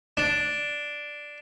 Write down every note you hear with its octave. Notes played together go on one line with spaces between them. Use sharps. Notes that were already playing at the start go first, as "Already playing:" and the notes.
D4